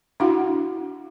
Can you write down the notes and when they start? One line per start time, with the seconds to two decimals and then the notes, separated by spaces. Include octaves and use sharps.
0.20 D4 E4 F#4 F5 F#5